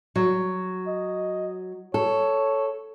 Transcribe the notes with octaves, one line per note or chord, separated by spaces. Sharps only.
F#3
D#5
A4 C#5